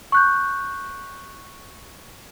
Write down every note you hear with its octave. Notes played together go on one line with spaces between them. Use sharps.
C#6 F#6 G6